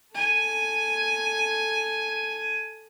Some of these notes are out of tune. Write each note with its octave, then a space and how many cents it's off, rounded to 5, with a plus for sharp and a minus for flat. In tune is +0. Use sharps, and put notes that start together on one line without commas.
A4 +0 G#5 +0